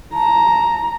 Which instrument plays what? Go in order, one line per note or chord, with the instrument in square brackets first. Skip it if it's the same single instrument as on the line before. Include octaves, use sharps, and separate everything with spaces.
[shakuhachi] A5 [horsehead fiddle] A#5